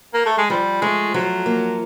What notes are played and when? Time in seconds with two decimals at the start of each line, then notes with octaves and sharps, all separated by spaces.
0.14 A#3
0.26 A3
0.38 G#3
0.50 F3 G3
0.81 G#3 A3
1.14 F3 F#3
1.46 A#3